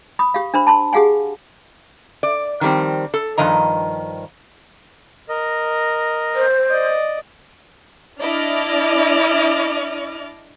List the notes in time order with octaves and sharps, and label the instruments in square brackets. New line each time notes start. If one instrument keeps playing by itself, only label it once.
[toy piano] B5 D#6
G4 F5
D4 A#4 C5 B5
A5 B5 C6
G4 G#4 F5 F#5 G#5
[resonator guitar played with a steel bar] D5
D#3 F3 G3 C4
A4
G2 D#3 F3 D#5 A#5
[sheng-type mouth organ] A#4 D#5
[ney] C5
[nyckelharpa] D5 D#5
[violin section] D4 E4 D5 D#5 D6 F6